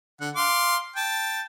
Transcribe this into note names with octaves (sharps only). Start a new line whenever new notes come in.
D3 F#5
F5 C6 D6
G5 A5